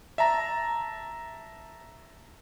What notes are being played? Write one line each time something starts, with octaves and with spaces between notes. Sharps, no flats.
E5 A5 A#5